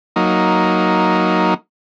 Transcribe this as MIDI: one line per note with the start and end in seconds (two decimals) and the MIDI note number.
0.16 1.54 54
0.16 1.54 58
0.16 1.54 63